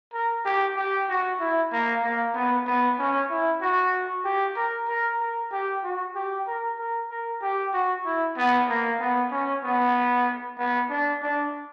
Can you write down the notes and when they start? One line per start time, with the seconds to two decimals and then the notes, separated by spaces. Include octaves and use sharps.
0.13 A#4
0.45 G4
0.76 G4
1.09 F#4
1.40 E4
1.72 A#3
2.03 A#3
2.34 B3
2.67 B3
2.99 C#4
3.30 E4
3.61 F#4
4.25 G4
4.56 A#4
4.88 A#4
5.20 A#4
5.52 G4
5.83 F#4
6.15 G4
6.47 A#4
6.78 A#4
7.10 A#4
7.42 G4
7.73 F#4
8.05 E4
8.37 B3
8.69 A#3
9.00 B3
9.31 C#4
9.64 B3
10.58 B3
10.90 D4
11.22 D4